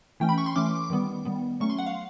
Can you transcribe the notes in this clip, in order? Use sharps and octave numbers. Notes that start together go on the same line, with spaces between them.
E3 A3 C#4 G5
B5
C#6
C6
E3 A3 C#4 D6
D#3 G3 B3
D#3 G3 B3
F#3 A3 C#4 C#6
C6
F#5
F5